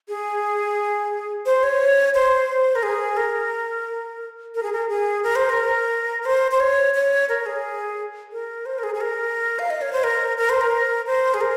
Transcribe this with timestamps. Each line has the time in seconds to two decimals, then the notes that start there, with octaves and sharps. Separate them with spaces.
0.08 G#4
1.46 C5
1.63 C#5
2.15 C5
2.75 A#4
2.83 G#4
3.17 A#4
4.55 A#4
4.63 G#4
4.73 A#4
4.89 G#4
5.23 A#4
5.36 C5
5.50 A#4
6.22 A#4
6.25 C5
6.51 C5
6.60 C#5
6.94 C#5
7.29 A#4
7.46 G#4
8.32 A#4
8.66 C5
8.79 A#4
8.83 G#4
8.94 G#4
9.01 A#4
9.59 F5
9.70 D#5
9.81 C#5
9.93 C5
10.04 A#4
10.38 A#4
10.50 C5
10.61 A#4
11.07 C5
11.34 G#4
11.41 A#4